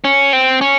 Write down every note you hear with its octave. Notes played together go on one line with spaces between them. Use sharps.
C#4
C4
C#4